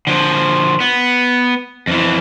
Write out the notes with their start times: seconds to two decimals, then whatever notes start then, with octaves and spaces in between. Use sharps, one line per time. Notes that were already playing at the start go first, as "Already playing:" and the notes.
0.07 D3 F3
0.80 B3
1.87 F2 E3